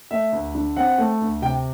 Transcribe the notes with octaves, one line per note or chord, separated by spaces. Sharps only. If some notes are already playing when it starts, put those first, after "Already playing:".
A3 E5
D2
D3
C4 F#5
A3
D2
C3 G5